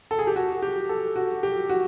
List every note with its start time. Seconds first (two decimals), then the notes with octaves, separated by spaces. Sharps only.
0.11 A4
0.19 G#4
0.27 G4
0.36 F#4
0.62 G4
0.89 A4
1.16 F#4
1.43 G4
1.69 F#4